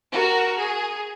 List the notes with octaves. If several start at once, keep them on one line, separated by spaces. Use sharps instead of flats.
F#4 A#4
G#4